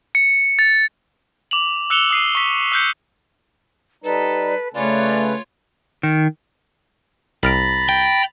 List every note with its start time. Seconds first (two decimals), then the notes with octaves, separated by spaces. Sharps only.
0.15 C#7
0.59 A6
1.51 D6 F7 F#7
1.90 E6 F#6 C#7 E7 F7 G7
2.10 D#6 C7 D#7
2.35 C#6 B6
2.72 E6 F#6 G6 C#7
4.04 G3 D#4 A4 B4
4.74 C#3 A3 C#4 F4 B4 C#5 D5
6.03 D#3
7.43 C2 A#5 B5 F6 A6 D7
7.89 G5